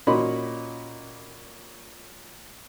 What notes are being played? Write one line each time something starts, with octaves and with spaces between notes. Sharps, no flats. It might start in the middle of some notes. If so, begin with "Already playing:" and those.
A#2 C#4 F#4 D#5 B5 C6